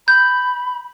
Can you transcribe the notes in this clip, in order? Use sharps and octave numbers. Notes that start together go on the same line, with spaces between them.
B5 G6